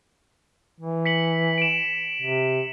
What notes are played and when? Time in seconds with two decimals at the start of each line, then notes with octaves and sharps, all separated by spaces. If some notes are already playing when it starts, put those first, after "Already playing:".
0.80 E3
1.05 B6 C#7 F#7
1.58 D7 E7
2.22 C3